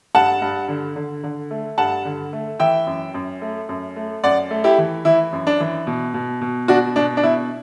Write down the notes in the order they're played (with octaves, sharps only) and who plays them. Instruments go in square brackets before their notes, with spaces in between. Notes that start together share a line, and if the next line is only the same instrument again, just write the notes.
[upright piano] G2 F#5 A5
G2
D3
D3
D3
A3
G2 F#5 A5
D3
A3
E3 E5 G5
F#2
F#2
A3
F#2
A3
F#2 D5 F#5
A3
E4 G4
E3
E3 E4
F#2
D4
E3
B2
B2
B2
B2 D4 F#4
B2 D4
D4
B2 E4